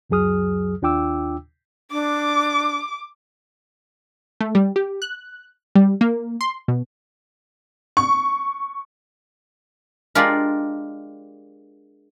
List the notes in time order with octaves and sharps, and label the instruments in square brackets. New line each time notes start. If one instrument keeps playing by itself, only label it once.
[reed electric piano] C#2 F#2 F#3 G#4 D#6 F6
D#2 D4 F4 G5 D6 E6
[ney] D4 [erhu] D6
[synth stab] A3
G3
G4
F#6
G3
A#3
C6
B2
[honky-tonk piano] C#6
[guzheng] G#3 D4 F4 G4 A#4